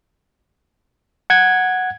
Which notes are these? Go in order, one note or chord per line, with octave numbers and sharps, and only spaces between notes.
F#5 G#6